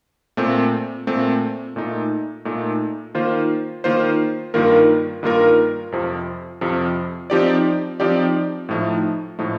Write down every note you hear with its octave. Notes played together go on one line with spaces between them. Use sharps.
A#2 A3 C4
A#2 A3 C4
A#2 A3 D#4
A#2 A3 D#4
D#3 A#3 F4 C5
D#3 A#3 F4 C5
G2 D#3 A#3 F4 A#4
G2 D#3 A#3 F4 A#4
F2 C3 F3
F2 C3 F3
F3 C4 D#4 G4 D5
F3 C4 D#4 G4 D5
A2 F3 A3 D#4
A2 F3 A3 D#4